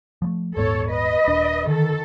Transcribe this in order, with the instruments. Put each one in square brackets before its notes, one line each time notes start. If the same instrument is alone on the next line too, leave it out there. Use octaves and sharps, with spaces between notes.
[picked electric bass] F3 G3 A3
[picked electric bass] D#1 G#2 B3 [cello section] A4 C#5
[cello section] B4 D#5
[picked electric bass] D#1 D4
[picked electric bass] D3 [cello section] D#3 A4